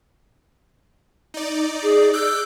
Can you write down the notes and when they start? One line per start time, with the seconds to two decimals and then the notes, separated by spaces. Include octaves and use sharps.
1.34 D#4 D5
1.83 G#4
2.13 D6 E6 F#6 G6